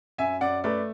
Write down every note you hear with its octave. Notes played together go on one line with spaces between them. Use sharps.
F#2 E5 G#5
F#2 D5 F#5
A3 B4 D5